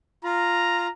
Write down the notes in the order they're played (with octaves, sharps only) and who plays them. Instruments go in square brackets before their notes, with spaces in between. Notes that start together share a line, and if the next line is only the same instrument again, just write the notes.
[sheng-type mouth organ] F4 [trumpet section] A#5